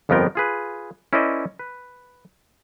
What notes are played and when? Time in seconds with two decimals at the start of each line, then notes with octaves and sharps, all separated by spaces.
0.09 G1 F2 F3 B3 A#4 G5
0.35 F4 G#4 B4
1.13 C#4 E4 A#4 C5 D5 D#5
1.59 B4